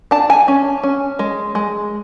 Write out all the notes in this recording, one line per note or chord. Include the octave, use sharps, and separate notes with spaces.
D4 A5
G#5
C#4
C#4
G#3
G#3